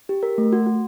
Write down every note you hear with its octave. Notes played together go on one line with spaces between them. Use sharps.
G4
A#4
A3
F#4
F#4